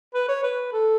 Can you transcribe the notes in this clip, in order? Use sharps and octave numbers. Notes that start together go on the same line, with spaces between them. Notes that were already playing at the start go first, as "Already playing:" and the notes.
B4
C#5
B4
A4